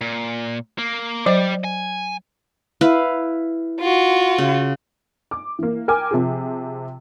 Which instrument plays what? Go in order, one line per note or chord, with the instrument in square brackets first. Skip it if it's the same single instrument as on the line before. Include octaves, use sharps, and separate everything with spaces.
[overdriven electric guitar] A#2
A#3
[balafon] F#3 C5 D#5 [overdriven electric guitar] G3 D5
[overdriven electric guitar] G#5
[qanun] E4 B4 F5
[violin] F4 F#4
[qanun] C#3
[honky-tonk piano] D6
E3 A#3
A#4 G5 G#5 D6
C3 F3 G#4